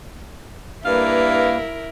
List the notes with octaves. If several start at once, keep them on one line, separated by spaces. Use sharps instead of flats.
G2 A#3 E4 A#4 B4 F5